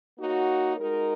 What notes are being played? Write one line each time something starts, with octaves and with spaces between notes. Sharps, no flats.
A#3 D#4 F#4 C#5
G#3 D#4 F#4 A#4